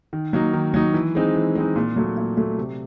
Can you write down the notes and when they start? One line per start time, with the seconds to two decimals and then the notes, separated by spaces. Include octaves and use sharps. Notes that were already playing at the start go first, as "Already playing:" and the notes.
0.13 D#3
0.33 F#3 A#3 D#4
0.53 D#3
0.74 F#3 A#3 D#4
0.94 E3
1.15 G#3 C4 D#4
1.35 E3
1.55 G#3 C4 D#4
1.75 A#2
1.96 F#3 A3
2.17 A#2
2.37 F#3 A3
2.58 C3